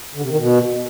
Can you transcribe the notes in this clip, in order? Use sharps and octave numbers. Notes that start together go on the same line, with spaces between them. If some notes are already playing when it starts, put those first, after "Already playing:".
D3
C3
D#3
B2